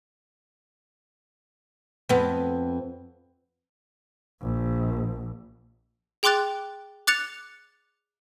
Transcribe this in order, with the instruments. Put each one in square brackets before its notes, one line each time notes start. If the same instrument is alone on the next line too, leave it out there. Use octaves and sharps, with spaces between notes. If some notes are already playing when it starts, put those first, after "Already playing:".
[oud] F2 B3
[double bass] A#1
[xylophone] G#4 G5 C6 D6 F#6 A6
D6 F#6 A6 C#7 F7